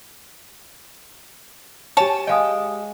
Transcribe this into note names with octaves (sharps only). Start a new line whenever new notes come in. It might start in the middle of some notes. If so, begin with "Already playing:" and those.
G4 C#5 G#5 A5
G#3 D#5 F5 G5 D#6